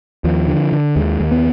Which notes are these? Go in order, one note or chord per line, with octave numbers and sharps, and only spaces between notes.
D#2 F3
D3
D3
D#2 G#3
D#2
B3